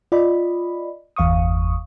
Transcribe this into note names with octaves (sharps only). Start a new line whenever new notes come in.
F4 D5 D#5 B5
G1 E2 F5 C#6 D#6